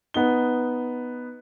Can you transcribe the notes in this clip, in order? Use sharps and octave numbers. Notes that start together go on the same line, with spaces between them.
B3 D#4 G7